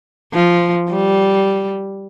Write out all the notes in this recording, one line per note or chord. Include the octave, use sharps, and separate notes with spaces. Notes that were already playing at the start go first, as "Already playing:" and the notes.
F3
G3